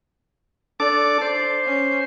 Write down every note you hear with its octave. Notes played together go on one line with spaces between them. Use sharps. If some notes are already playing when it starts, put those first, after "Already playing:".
D4 A4 D5 D6
C5
C#4